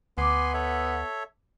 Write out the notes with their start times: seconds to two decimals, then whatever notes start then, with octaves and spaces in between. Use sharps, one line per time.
0.18 D2 B3 G#5 C6 D6
0.54 A4 C#5 E5